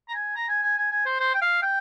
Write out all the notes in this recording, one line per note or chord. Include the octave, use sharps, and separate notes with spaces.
A#5
G#5
A#5
G#5
G#5
G#5
G#5
C5
C5
G5
F5
G5